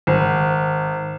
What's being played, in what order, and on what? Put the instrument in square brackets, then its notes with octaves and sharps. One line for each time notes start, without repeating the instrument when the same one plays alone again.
[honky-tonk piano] G#1